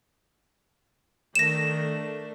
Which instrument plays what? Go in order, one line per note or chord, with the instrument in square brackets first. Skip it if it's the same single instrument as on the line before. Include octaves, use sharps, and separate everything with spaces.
[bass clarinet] D#3 [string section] A3 D4 [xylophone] A#6 E7